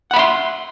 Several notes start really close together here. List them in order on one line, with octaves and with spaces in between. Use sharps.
F#5 B5 E5 C6